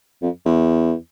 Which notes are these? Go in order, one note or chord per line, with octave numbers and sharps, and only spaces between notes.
F2
E2